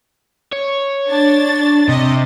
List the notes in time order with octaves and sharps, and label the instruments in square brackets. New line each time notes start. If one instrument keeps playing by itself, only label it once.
[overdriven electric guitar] C#5
[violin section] D4 A6
[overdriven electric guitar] C3 [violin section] D#5